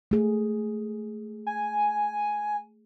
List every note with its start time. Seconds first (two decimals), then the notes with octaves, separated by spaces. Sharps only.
0.11 A3 G#4
1.47 G#5